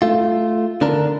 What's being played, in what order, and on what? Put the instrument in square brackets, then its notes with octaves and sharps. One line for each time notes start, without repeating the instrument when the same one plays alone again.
[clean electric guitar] A3 F4
D3 D4 A4 A#4